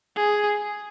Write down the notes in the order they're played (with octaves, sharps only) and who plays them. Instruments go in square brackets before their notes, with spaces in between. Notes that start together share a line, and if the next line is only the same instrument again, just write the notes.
[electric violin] G#4